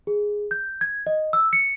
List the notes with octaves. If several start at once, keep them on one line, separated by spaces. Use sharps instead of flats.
G#4
G6
G#6
D#5
E6
C#7